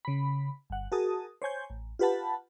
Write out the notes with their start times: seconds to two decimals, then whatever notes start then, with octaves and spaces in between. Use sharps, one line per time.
0.05 C#3 B5
0.70 G1 F#5
0.92 F#4 G#4 A#4 A5 D#6
1.42 C5 C#5 G#5 G6
1.70 A1
1.99 F4 G4 B4 F#5 A5 B5